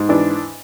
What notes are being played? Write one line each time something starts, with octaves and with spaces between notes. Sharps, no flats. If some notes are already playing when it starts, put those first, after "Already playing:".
Already playing: G#2
E3 D4